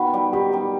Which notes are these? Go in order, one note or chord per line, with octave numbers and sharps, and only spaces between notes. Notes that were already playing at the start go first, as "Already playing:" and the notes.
Already playing: D#3 B3 F#4 B4
G3 D#4
D#3 G4
G3 D#4